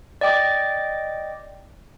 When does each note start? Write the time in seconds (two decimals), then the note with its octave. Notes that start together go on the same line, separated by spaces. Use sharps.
0.21 D5 D#5 G5 D6